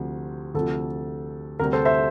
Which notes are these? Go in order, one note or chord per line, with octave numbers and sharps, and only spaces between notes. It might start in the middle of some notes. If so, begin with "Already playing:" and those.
Already playing: D2 C3 F3
D2 C3 F3 A4
D2 C3 G3 A#4
A4 C5
C5 E5